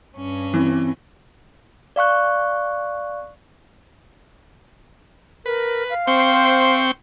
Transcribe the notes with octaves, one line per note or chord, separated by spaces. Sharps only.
G2 C#4
E3 C4
D5 F5 C#6 F#6
A#4 B4
F5
C4 C5 G5 C#6